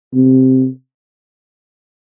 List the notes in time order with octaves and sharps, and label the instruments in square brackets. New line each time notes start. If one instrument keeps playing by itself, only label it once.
[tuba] C3